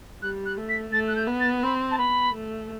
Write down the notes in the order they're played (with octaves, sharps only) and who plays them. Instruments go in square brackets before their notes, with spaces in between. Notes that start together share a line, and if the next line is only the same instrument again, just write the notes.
[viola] G3 [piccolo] F#6
[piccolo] F#6
[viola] A3
[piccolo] B6
[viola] A3 [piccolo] A6
[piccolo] F#6
G6
[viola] B3
[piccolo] A6
[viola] C4 [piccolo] B5
[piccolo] A5
[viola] B3 [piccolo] B5
[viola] A3